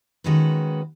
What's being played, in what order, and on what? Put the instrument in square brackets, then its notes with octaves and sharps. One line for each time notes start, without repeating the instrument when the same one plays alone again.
[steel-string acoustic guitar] D#3 G#3 C#4 F#4 B4